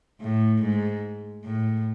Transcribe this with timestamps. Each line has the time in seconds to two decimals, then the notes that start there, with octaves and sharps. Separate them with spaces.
0.21 A2
0.62 G#2
1.44 A2